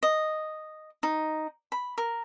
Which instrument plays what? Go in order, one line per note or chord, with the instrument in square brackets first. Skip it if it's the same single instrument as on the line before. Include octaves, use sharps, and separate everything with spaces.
[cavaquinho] D#5
D#4
B5
A#4